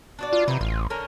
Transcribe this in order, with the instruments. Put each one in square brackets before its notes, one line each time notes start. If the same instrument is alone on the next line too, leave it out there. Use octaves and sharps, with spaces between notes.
[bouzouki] D4 F#4 D5
[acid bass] F4
[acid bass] C3 [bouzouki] E3 F#3 D#4
[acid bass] A1 [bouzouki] F4
[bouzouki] D3 C#4 A#4